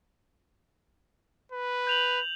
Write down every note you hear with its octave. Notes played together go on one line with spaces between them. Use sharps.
B4
G6 F7 F#7